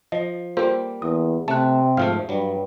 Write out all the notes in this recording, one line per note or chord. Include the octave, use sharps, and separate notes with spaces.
F3 D#5
G3 A#3 F4 A4 C5
E2 D#6
C3 A3 A5 F#6
G#2 F3 A3 F5 F6
G2 F#3 G3